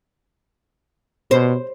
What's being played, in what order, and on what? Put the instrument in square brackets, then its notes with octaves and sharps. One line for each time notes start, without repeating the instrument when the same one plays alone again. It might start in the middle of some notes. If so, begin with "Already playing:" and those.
[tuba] B2 [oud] C5